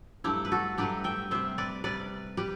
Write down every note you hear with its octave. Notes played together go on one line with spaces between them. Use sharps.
G2 F#3 A3 E4 G4
B4
F#4 A4
G2 F#3 A3 G4 B4
E5 G5
C3 G3 C5 E5
B4 D5
C3 G3 B4 D5
G3 G4 B4